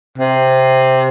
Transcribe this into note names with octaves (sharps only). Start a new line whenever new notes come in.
C3